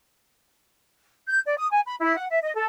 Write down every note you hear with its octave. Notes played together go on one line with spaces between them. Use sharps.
G6
D5
D#6
G#5
B5
E4
F#5
E5
D#5
A4